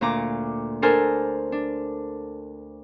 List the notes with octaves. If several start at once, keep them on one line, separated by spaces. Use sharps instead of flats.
D2 A#2 A#5 D6
D4 A4 A#4 C5 G#5
D4